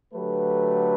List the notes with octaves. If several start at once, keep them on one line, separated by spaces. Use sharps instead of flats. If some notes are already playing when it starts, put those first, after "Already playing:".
D3 F#3 A3 G4 B4